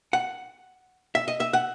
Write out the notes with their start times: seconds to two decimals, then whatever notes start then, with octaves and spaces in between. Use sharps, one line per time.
0.13 F#5
1.15 E5
1.28 D#5
1.40 E5
1.53 F#5